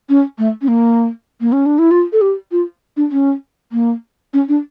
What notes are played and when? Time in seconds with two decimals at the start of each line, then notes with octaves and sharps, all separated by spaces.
0.09 C#4
0.38 A3
0.62 C#4
0.69 A#3
1.41 A#3
1.52 C#4
1.66 D4
1.79 E4
1.91 F4
2.13 A4
2.21 G4
2.52 F4
2.97 D4
3.12 C#4
3.72 A#3
4.34 C#4
4.49 D4